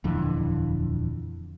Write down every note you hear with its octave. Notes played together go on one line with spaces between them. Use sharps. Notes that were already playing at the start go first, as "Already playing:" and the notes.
D#1 F2 D3 E3